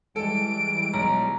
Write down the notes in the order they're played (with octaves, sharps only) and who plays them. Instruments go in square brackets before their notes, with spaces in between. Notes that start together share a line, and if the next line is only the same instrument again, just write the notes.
[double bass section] E3 G3 G#3 [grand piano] A4 [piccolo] D7
[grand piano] B1 [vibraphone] A#5